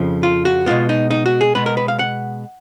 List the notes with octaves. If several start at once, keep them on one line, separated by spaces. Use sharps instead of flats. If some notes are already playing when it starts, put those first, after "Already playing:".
Already playing: F2 C#3 F3
F4
F#4
B2 G#3 B3 F4
D#4
D#4
F#4
G#4
B2 G#3 B3 B4
A#4
B4
F5
F#5